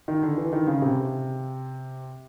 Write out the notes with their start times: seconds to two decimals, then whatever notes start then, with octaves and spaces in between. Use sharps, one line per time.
0.08 D#3
0.23 D3
0.37 E3
0.53 D#3
0.67 C#3
0.82 C3